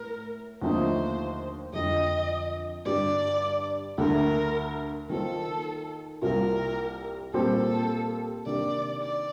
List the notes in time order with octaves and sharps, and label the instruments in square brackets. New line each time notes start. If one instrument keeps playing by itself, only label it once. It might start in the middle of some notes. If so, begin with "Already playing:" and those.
Already playing: [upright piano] A2 [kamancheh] A#4
[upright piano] D#2 D3 F3 A3 D#4 [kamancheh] C5
[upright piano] F2 D3 F3 [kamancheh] D#5
[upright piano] G2 D3 G3 [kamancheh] D5
[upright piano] D2 D3 A3 [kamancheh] A#4
[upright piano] D#3 A#3 F4 C5 [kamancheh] A4
[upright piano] C2 C3 G3 A#3 F4 [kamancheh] A#4
[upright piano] A#2 G3 C4 G4 C5 [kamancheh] A4
[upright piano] C3 D#3 A#3 D4 G4 [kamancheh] D5
[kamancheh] D5